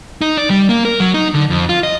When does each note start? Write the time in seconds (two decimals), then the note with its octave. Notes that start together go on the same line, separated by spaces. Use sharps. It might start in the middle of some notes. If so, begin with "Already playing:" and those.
0.21 D#4
0.37 D5
0.50 G3
0.69 A#3
0.85 A#4
1.00 F#3
1.14 D#4
1.34 D3
1.50 F2
1.69 F4
1.83 D#5